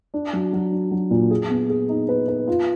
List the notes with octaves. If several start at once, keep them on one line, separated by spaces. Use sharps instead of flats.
D4
F#3
F#3
D4
F#3
A#2
G#4
B3
G#4
D#4
B4
B4
F4